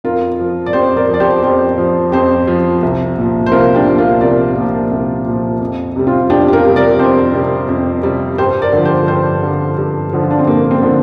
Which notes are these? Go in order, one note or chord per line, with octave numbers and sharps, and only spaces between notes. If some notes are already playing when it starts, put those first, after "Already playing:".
F2 F4 A#4
F3
D5
F2 G4 C5
A#4 D5
F3
D5
G4 C5
F2 G4 C5
F3
F2 G4 C5
F3
C2
A#2 F3
C5
C2 F4 A#4
D4 G4
A#2 F3
F4 A#4
C2 A#4 D5
A#2 F3
C2
A#2 F3
F2
C3 G3
C4 F4
F2 D4 G4
G4
F4 A#4
C3 G3
A#4 D5
F2 G4 C5
C3 G3
F2
C3 G3
G2 G4 C5
A#4 D5
D3 F3
G4 C5
G2 G4 C5
D3 F3
G2
D3 F3
F4
D4
C4
G2 A#3
A#3
C4
D3 F3